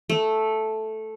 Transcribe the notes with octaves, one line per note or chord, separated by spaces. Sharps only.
A3